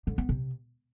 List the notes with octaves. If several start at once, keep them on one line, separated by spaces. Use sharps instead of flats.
D3
B3
C3